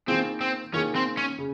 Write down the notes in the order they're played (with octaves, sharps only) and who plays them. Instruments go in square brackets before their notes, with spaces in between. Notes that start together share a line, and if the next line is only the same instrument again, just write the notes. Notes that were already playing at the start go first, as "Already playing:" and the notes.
[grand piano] D#3 A#3 F4 G#4 [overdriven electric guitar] C4
[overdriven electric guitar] C4
[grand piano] D#3 A#3 F4 G#4 [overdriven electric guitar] C#4
[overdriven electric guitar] C4
C#4
[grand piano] C#3